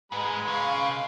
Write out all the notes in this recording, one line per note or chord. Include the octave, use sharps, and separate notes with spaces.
G#2 G#3 B4 B5
C#3 F5